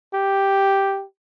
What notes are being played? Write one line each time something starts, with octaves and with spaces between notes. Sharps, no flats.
G4